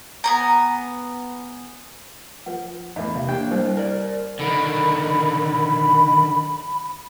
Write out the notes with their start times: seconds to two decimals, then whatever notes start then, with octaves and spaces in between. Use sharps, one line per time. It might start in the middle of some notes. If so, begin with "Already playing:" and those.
0.24 B3 G#5 A#5
2.46 F3 B4 F#5
2.96 E2 A2 B4 D#5
3.15 C3 E5 F5
3.28 A#3 D4 G4 C#5 G5
3.51 C2 G2 C5 D#5
3.77 A#4 D5
4.39 D3 D#3 B5